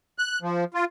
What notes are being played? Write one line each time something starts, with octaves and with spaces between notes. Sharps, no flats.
F#6
F3
F4